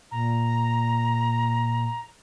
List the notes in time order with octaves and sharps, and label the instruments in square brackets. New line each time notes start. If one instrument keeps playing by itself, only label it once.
[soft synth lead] A#2 [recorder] A#5